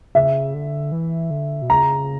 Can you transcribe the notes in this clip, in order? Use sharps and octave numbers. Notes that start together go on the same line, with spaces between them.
C#3 E5
D3
E3
D3
B2
C#3 A#5